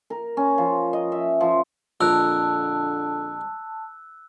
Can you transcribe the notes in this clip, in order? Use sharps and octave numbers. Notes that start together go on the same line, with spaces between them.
A#4
C#4
F3
D#5
E5
F3
A#1 F2 D3 A#4 A5 E6 F#6